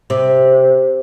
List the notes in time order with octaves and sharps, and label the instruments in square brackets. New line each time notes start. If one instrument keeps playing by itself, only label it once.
[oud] C3